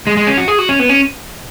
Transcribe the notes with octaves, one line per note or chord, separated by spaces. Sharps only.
G#3
G#3
C#4
F#4
G#4
F#4
C#4
B3
C#4